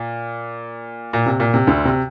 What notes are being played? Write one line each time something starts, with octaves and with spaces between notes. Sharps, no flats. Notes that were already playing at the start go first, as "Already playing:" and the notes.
Already playing: A#2
A#2
C3
A#2
C3
D2 D3
C3